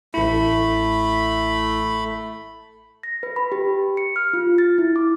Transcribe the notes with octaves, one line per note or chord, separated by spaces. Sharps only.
A1 A3 E4 B5
A#6
B4
B5
G4
C#7
F6
F4
A6
E4
D6